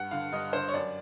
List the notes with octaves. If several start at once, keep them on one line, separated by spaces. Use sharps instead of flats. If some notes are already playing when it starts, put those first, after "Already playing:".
Already playing: G2 F#5
D3 F5
G2 D#5
D3 C5
C#5
F#2 D5